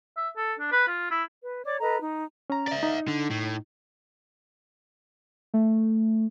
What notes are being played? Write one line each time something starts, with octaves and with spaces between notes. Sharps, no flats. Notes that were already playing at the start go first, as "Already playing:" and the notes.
E5
A4
D4
B4
F4
E4
B4
C#5 D5 D6
A4 B4 D#5 A#5
D#4
C#4 A#5
D5 E5
D#4
D3
A2
A3